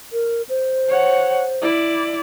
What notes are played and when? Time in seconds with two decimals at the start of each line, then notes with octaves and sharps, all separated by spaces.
0.13 A#4
0.49 C5
0.89 C#5 F#5
1.62 E4 D5